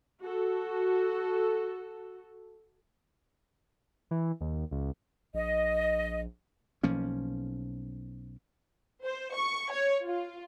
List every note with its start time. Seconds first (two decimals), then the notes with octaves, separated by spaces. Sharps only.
0.22 F#4 A4
4.11 E3
4.41 D#2
4.71 C#2
5.34 A#1 D#5
6.83 B1 F3 A#3 C#4
9.03 C5
9.33 C#6
9.71 C#5
10.04 F4